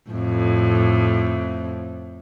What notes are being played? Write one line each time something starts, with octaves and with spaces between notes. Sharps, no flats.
F2 A2